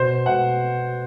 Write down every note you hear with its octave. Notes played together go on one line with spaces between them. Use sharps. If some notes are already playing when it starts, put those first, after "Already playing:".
Already playing: B2 C5
B2 F#5